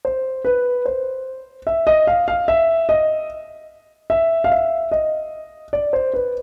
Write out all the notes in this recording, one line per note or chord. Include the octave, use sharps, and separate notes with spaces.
C5
B4
C5
E5
D#5
F5
F5
E5
D#5
E5
F5
E5
D#5
D5
C5
B4